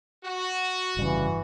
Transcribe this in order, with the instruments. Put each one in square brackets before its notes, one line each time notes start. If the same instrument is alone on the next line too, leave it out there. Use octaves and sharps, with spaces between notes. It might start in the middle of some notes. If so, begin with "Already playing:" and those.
[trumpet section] F#4
[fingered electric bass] F1 G2 C#3 [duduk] E3